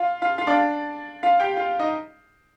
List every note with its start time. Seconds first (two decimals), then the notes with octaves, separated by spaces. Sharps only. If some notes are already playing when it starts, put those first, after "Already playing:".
Already playing: F4 F5
0.22 F4 F5
0.38 F4 F5
0.47 D4 D5
1.23 F4 F5
1.40 G4 G5
1.57 F4 F5
1.79 D#4 D#5